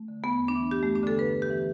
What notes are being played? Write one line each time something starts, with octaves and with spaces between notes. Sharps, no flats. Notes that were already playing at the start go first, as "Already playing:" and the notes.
Already playing: A3
D3
E2 B3
E2
D4
E3
G2 G4
G2 A3
D4
D3 A4
G2 B4
G2
G4
E3